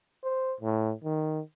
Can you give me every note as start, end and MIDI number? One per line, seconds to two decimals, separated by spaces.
0.24 0.54 72
0.60 0.93 45
1.04 1.41 51